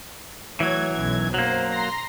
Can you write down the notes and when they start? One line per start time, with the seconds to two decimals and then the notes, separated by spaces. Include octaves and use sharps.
0.60 E3 F#3 A3 C#5 G#6
0.92 B1 F#2 G#6
1.34 F#3 A#3 C5
1.73 A#5 C6 A#6